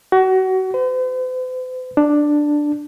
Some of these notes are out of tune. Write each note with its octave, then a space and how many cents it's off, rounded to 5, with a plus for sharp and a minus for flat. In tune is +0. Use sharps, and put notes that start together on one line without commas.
F#4 +25
C5 -45
D4 +5